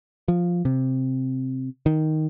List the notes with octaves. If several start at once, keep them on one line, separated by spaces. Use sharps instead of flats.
F3
C3
D#3